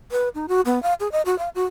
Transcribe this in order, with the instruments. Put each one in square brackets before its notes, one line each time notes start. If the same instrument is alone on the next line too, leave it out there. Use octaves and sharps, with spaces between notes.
[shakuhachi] B4
D#4
F#4
B3
F5
G#4
D#5
F#4
F5
F#4